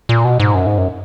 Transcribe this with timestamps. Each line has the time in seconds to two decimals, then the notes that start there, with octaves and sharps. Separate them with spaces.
0.09 A#2
0.24 B2
0.40 G#2
0.55 F#2
0.66 G#2
0.78 F#2